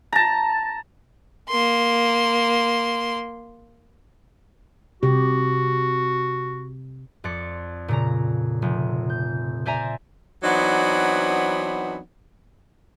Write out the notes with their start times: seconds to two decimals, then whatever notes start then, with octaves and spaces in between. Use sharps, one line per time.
0.13 A5 A#5
1.49 A#3 C6
5.03 C3 F#4 G4
7.24 F2 D5 C#7
7.88 A#2 C#3 A#5
8.62 F1
9.10 G6
9.66 C5 D5 E5 G#5 A#5
10.43 E3 F#3 B3 C4 D4 D#4